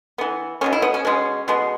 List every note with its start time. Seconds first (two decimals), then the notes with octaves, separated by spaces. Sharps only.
0.18 E3 B3
0.61 B2 G#3 B3 C#4
0.73 E4
0.82 B3
0.94 C#4
1.05 B2 G#3 B3 C#4
1.48 B2 G#3 B3